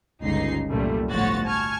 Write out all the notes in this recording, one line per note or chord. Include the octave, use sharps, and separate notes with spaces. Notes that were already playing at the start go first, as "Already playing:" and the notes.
G1 C#2 D#4 C7
C2 F#2 A#2 G3 A3
G1 A2 F3 F#4 C#5 A6
G#5 A5 C#6 F6 G#6